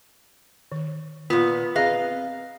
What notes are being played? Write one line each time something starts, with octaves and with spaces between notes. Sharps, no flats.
D#3
A#2 B3 F4
C4 G#4 B4 D#5 F5